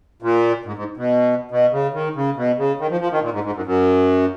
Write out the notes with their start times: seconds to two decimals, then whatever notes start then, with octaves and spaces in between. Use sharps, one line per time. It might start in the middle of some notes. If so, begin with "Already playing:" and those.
0.22 A#2
0.65 G#2
0.76 G#2
0.97 B2
1.51 B2
1.72 C#3
1.94 D#3
2.15 C#3
2.37 B2
2.58 C#3
2.79 D#3
2.91 F3
3.01 F3
3.12 D#3
3.22 A#2
3.33 G#2
3.44 G#2
3.54 F#2
3.66 F#2